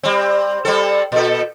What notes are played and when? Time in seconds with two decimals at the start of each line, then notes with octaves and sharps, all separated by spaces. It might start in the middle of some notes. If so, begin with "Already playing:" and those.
0.03 G3 C4
0.65 G3 C4 A4
1.12 A#2 A4